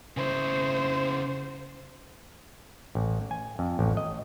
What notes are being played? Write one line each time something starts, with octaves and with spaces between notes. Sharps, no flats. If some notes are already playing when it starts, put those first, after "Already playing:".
C#3 E4 C5
A1
G#5
F2
A1
D#5